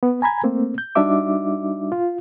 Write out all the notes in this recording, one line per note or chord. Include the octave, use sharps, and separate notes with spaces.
B3
G#5 A#5 B5 G#6
A3 A#3 C4
G6
G3 D4 D#4 F#4 E5 D6
F4